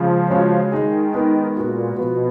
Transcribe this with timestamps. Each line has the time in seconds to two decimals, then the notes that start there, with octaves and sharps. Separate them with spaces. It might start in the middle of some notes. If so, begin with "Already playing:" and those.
Already playing: C#3 F3 G#3 C#4 G#4
0.30 C#3 G#3 C#4 F#4
0.72 D#3 G#3 D#4 G#4
1.14 G#3 B3 D#4 A#4
1.56 A#2 G#3 B3 F#4 A#4
1.96 B2 F3 B3 F#4